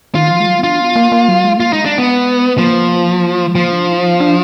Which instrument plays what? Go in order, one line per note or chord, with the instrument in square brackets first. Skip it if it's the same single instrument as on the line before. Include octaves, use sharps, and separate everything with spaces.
[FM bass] D#3 [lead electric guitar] F4
[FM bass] F3
G#3
F#3
B3
[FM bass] D4 [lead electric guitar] F4
[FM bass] B3
A#3
A#3
F#3
G#3
[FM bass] A#3 [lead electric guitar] F4
[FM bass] G#3 [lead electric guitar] D#4
[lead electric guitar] D4
B3
[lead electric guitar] F3 [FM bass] A#3
[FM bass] G#3
[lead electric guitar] F3 [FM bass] A#3
[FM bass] D4
D#4
D4
D#4
B3
D4